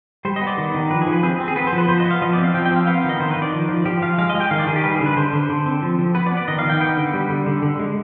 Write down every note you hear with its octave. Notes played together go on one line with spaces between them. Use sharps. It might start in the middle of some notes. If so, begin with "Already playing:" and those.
G3 C5
D#5
B3
D5
D#3
D#3
F3 B4
G#4
F3
B4
C4 G#4
C4
G#4
B3 B4
C5
F3
B4
F3 C5
D#5
B3
F5
F3 D#5
D5
C4
F5
F3 G5
G5
C4 F5
B3 F5
F5
D#3
D#5
D#3 C5
B4
D#3
D5
F3
F3
F3 G4
F3 F5
G#3 F5
D#5
G#3
G5
D#3 F5
D5
D#3 G#4
G4
G3 B4
G#4
D3
B4
D3 C5
D3
D3
C4
F3
F3
B3 B4
D5
B3
D5
D#3 D#5
F5
D#3 G5
B3 G5
D3
G3
D3
D3
D3
G#3